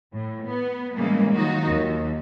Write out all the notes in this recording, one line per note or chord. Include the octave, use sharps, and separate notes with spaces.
A2
B3
A2 C#3 E3 G3 G#3 A#3
D#3 F#3 D#4 F4 F#4
D#2